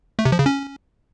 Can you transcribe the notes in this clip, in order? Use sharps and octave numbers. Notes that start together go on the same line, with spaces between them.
A3
C3
F3
C#3
C#4